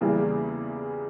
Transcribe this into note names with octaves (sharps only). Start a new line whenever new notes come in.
E2 C#3 E3 G3 A#3